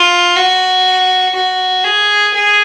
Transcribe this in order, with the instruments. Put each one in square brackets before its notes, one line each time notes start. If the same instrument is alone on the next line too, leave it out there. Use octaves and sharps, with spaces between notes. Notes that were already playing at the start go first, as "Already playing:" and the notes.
Already playing: [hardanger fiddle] F4
F#4
F#4
G#4
G#4